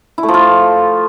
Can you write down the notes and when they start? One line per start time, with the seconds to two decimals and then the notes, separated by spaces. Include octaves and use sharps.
0.18 E4
0.23 A3
0.29 F3
0.34 F4